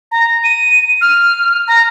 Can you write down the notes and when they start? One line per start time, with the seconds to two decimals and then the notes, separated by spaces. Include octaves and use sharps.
0.12 A#5
0.44 D#7
1.01 F6
1.68 A#5